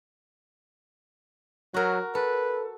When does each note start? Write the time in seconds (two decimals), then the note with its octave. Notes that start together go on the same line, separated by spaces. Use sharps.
1.74 F#3 F#4 A#4
2.15 A4 B4